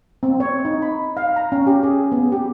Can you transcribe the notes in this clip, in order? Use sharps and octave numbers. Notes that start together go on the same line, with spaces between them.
C4
C#5
D#4
B5
F5
A#5
C#4
G4
G#4
B3
G4